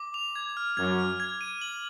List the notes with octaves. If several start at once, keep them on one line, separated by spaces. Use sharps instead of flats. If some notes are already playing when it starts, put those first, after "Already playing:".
Already playing: D6
F7
G#6
F6
F#2 G#6
F6
G#6
D#7
F#7